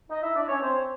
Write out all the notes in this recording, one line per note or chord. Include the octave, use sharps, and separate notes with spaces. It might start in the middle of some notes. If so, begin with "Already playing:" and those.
D#4 D#5
E4 E5
D4 D5
C#4 C#5
C4 C5